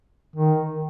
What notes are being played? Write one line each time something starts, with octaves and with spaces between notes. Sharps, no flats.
D#3